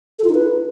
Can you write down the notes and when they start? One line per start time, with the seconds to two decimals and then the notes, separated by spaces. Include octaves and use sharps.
0.19 A4
0.24 F4
0.29 D#4
0.34 B4